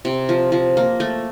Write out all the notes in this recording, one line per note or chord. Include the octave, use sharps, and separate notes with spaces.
C3
F3
F3
A#3
A3